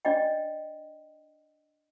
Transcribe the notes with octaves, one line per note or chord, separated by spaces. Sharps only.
D4 D5 D#5 G5